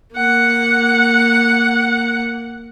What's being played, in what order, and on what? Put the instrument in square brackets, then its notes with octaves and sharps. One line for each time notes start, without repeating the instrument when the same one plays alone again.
[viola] A#3 F#5